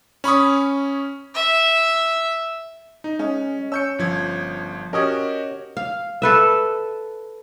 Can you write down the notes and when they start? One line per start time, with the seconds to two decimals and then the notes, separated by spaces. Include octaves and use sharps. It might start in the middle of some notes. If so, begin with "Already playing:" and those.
0.24 C#4 B5 C#6 D#6
1.35 E5
3.04 D#4
3.19 G#3 C#4
3.72 C#4 E6 G6 C#7
3.99 G1 F3 G#6
4.93 C#4 F#4 G4 A#4 D#5
5.77 F5
6.22 A4 B4 E5